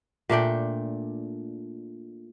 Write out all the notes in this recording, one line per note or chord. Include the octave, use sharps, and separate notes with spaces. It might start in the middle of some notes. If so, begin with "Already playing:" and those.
A#2 A3 D4 G5